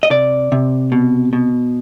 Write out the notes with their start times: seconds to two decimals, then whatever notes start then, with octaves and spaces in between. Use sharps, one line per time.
0.03 D#5
0.10 C3 D5
0.52 C3
0.92 B2
1.33 B2